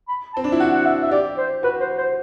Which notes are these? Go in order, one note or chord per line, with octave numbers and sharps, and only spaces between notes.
B5
A5
C4
D4
E4
F#4 F#5
F#5
E5
E5
G4 D5
C5
F#4 B4
C5
C5